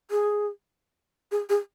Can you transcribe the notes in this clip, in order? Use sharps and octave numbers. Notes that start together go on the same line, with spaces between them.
G#4
G#4
G#4